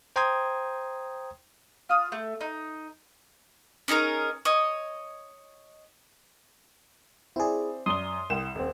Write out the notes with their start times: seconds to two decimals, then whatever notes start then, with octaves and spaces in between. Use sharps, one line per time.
0.16 C5 G5 A#5 C6 D#6 G#6
1.89 F4 D#6
2.12 A3
2.41 D#4
3.88 C#4 D#4 G#4 A#4
4.45 C#5 D#5
7.36 C4 E4 G#4 D5
7.86 F#2 D5 C6 D#6 G7
8.30 C2 G5 E7
8.55 D#1 C4